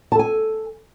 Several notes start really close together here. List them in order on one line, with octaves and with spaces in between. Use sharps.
A5 A4 G#5